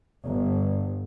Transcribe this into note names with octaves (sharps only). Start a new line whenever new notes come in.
G1